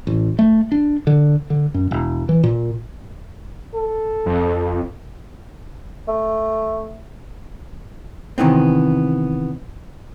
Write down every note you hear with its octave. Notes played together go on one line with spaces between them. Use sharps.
A1
A3
D4
D3
D3
F#2
E1
E3
A#2
A4
F2
A3
C3 D#3 E3 B3 C4